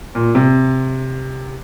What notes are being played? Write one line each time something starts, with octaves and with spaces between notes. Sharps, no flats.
A#2
C3